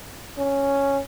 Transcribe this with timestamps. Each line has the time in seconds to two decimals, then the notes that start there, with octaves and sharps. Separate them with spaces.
0.38 C#4